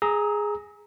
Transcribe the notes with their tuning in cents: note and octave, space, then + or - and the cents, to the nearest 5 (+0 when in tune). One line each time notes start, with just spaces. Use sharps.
G#4 +0 A#5 +0 E6 -45